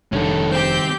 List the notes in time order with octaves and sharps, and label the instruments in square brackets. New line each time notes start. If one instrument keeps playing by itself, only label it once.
[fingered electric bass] F1 D4 [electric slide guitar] G2 D#3 [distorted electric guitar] C#4 A4
[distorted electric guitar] C4 [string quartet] G4 G6